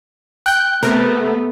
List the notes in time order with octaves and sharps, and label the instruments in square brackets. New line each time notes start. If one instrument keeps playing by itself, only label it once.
[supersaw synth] G5 G6 [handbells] F#6
[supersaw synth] C3 A#4 [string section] A3 [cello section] B3